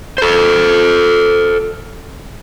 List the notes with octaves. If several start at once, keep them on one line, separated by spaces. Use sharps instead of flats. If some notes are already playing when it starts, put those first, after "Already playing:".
A4 C5